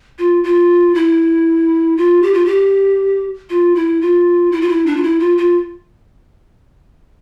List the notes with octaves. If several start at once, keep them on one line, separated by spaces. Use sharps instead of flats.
F4
F4
E4
F4
G4
F4
G4
F4
E4
F4
E4
F4
E4
D4
F4
E4
F4
F4